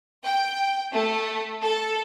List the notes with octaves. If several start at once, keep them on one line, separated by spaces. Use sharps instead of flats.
G5
A3
A4